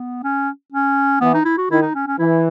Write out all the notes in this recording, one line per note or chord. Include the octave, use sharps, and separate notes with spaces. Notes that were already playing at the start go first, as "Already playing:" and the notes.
Already playing: B3
C#4
C#4
E3 B3
D#4
E4
F#4
D#3 E4
D#4
C#4
C#4
E3 E4